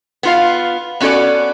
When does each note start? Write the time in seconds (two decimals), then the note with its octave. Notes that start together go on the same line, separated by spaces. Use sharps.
0.23 B3 F4 F5
1.00 B3 C#4 F#4 A4 D5